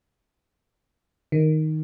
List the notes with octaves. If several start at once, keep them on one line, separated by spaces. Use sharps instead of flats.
D#3